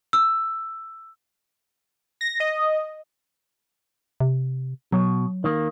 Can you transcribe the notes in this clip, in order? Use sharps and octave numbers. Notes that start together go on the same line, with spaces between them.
E6
A#6
D#5
C3
B2 F#3
D#3 A#3